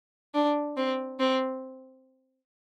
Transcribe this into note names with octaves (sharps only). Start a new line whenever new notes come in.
D4
C4
C4